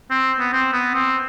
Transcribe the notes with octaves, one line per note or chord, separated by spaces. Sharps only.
C4
B3
C4
B3
C4